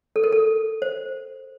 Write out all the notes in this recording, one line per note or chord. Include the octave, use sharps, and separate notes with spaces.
A4
A#4
A4
C5